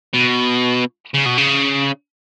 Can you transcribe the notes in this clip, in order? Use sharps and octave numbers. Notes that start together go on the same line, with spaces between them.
B2
C#3
B2
C#3